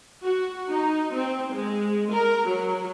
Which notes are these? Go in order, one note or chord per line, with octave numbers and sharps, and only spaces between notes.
F#4
D#4
C4
G#3
A#4
F#3